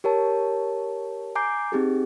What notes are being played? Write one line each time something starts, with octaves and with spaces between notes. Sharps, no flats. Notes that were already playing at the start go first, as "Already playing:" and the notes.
G4 A#4 C#5 A5
G#5 A#5 D6 G6 C7
C4 D#4 G4 G#4